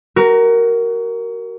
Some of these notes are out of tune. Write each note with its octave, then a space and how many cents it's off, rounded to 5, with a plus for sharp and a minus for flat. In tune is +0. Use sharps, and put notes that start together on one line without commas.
F#4 +30 A#4 +0